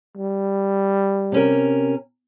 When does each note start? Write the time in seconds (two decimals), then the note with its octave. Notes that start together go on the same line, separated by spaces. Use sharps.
0.18 G3
1.32 C3 C#4 A#4